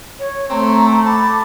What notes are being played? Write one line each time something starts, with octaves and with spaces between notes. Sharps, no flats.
C#5
A3 C4 A#5
A5 B5 D6